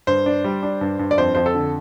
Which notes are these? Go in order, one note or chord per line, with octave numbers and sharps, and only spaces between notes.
G2 C5
D4
G3
D4
G2
G2
D5
F2 C5
F2 C5
A4
D3